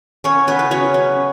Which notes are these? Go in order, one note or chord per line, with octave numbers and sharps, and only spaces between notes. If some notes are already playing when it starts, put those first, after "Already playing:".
B3 C#4 C#5
C#3 B3 B4
B4
F#3 C#4 C#5
C#4